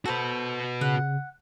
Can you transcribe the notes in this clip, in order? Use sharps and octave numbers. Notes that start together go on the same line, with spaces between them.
F#4 A4 B4 C5
C#3 F#5